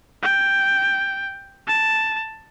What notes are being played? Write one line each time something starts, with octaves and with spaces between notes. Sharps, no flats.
G5
A5